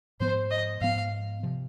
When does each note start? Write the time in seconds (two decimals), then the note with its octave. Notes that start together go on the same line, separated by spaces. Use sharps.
0.20 G#2 F3 B3 C5
0.51 D#5
0.81 G#2 F3 B3 F5
1.43 C3 F3